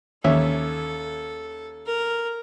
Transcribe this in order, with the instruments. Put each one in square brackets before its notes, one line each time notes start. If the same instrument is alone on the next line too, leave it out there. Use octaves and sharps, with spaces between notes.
[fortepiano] D#2 C#4 E5 [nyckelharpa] A4
[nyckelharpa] A#4